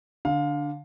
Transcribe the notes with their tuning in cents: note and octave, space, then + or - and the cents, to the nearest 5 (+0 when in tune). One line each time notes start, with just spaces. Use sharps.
D3 +0 F5 +20